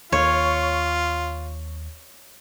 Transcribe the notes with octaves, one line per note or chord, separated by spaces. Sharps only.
D#2 F4 C#5